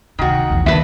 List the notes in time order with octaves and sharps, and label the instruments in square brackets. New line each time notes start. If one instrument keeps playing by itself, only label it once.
[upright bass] D2 C3 [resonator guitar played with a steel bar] D#3 F#4
[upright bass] B1 E2
[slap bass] D#2 D#3 [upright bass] F3 [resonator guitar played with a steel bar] D4 B4 E5